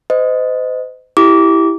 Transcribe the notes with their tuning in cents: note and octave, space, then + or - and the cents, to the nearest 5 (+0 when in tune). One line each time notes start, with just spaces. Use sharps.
C5 -35 D#5 +0
E4 +0 G4 +0 D6 -20